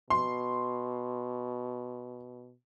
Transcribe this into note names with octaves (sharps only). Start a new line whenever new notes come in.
B2 C6